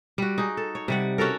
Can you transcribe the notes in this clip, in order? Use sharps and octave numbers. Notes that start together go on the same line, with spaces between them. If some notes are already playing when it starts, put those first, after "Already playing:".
G3 F#4
D#4 G#4
A4
C#5
C3 G3 F#5
C#4 F#4 A4 A#4